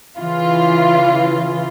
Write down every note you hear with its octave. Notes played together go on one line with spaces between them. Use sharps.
C#3 E3 F4